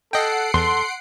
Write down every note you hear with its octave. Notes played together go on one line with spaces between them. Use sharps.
A4 D#5 F#5 G5 C7 D7
E2 A4 C6